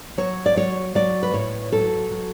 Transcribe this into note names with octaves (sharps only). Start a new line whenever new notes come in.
F#3 C#5
D5
F#3 C#5
F#3 D5
B4
A2 C#5
F#3 A4
F#3